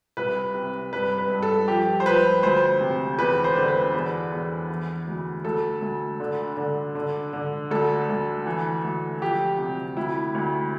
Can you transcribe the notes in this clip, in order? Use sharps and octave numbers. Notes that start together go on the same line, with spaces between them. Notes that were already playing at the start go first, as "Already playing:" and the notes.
C2 B4
C3
G2 B4
B4
G2
A4
F3 G4
C5
F3 B4
D2 C5
C3
E2 B4
C5
D3
B4
E2
E2
E3
D2
D2 A4
D2
D3
D3
D3
D3
D2 A4
D2
E3
D2
F3 G4
C3
D2 E4
D2